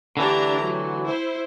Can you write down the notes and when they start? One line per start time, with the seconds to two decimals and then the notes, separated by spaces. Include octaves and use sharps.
0.17 D3 E3 A3 D4 G4 A#5
0.64 F#3
1.06 E4 C5